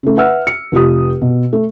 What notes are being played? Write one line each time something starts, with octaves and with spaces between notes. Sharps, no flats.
C#3 A3
B4 E5 F#5 E6 F6
C#7
F1 F4 G4 D#6
B2
A3